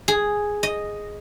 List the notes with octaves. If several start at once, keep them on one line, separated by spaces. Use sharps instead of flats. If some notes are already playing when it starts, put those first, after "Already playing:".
G#4
D#5